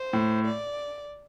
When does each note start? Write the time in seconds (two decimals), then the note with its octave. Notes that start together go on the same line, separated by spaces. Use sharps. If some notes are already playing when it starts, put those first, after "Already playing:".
Already playing: C5
0.13 A2
0.45 D5